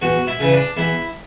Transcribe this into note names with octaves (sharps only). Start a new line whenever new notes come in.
E2 F#4
E4
C#3 E3
D4
E2 E4